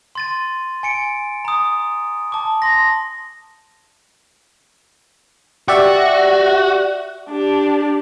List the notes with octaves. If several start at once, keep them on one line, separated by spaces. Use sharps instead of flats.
C6 A6 D#7
G#5 C#7 D7
A#5 D#6
A5 D6
C6 A#6
F#4 G4 D5 E5
D4 G4